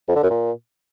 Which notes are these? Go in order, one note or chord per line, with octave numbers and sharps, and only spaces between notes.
F2
D3
F#2
A#2